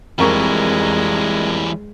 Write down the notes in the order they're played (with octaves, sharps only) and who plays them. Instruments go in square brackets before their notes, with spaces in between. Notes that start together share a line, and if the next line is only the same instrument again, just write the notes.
[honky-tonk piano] F2 A#4 C#6 [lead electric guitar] E3 G3 [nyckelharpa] G#3